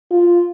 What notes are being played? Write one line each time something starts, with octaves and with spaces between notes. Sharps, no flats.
F4